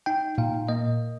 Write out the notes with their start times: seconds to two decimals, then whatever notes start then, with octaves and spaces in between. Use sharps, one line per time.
0.06 D#4 G5
0.38 A#2 F5
0.69 A#3 D#5